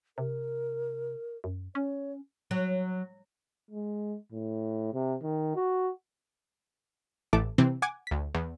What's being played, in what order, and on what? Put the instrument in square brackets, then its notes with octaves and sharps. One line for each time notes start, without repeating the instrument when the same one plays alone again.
[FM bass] C3 [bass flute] A#4
[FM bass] F#2
[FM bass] C#4 [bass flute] C#5
[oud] F#3
[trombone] G#3
A2
C3
D#3
F#4
[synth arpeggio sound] A1 E3 A3 A5 D6
C3 E3 C4
F#5 G#5 D6 G#6
D2 B6
E2